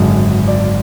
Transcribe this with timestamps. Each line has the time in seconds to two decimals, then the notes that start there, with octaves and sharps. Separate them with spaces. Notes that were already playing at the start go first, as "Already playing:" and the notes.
Already playing: G#1 F#2 D3 G#3
0.48 D5